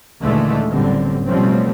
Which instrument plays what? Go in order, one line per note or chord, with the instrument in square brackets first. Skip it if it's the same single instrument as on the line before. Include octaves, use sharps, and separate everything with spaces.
[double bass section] D#2 A#2 D3 E3 G#3 A3
F#1 A2 D3 G3 C4
B2 F3 G3 A3 C4 C#4